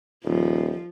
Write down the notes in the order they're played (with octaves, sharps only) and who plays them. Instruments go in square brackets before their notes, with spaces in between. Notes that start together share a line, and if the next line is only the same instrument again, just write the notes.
[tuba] D#1 [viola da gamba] F3